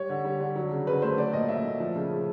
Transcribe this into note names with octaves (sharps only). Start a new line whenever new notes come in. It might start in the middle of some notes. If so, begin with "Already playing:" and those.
Already playing: G3 C#5
D3
G3
D3
F#3
C#3
C#3 B4
A3 C5
F#3 D5
A#2 D#5
A#2 E5
A3
F3
C#3
C#3